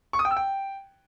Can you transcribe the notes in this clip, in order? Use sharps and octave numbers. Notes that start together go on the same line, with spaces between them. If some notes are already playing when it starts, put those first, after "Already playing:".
C#6
D#6
G5
E6
G5